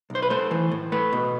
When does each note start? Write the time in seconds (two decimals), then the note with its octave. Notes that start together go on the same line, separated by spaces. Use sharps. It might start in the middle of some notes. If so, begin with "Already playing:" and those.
0.10 B1
0.15 C5
0.22 B4
0.30 A3 C5
0.51 E3
0.71 A2
0.92 A3 B4
1.13 B2